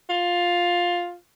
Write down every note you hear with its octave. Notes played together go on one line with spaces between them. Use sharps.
F4